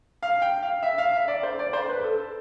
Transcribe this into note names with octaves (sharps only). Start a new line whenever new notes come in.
F5
G5
F5
E5
F5
E5
D5
C5
D5
C5
B4
A4